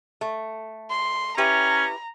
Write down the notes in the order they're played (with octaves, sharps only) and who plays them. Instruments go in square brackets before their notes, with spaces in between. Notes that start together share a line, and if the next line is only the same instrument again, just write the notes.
[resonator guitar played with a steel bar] A3
[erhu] C6
[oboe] C#4 [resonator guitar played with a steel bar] E4 G4 B4 [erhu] A#5